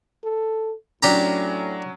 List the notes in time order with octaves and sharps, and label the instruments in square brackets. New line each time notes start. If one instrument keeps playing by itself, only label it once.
[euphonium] A4
[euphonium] A2 [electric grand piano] F#3 C#4 [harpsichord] D4 G4 A#5